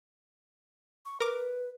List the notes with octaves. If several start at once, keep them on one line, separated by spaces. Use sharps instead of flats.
C#6
A#4 B4 D6